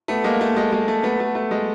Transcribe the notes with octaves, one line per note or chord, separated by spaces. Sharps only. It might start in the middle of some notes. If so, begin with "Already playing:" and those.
A3 B3
G#3 A#3
A3
G#3
G#3
A3
A3 B3
A3
A3
G#3